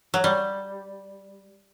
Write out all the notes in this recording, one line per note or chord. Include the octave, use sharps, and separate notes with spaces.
F#3
G3